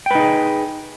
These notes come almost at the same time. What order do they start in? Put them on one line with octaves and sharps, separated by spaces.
G5 B4 D#4 G#4